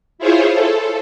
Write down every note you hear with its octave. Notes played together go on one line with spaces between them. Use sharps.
E4 F4 G#4 C5 C#5
A4